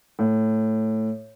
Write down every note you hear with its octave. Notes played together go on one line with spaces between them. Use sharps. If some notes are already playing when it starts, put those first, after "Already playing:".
A2